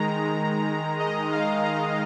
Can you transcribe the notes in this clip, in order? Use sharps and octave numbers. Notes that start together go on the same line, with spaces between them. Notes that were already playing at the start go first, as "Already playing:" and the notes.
Already playing: D#3 G#3 A#5
D#5
F5
A#5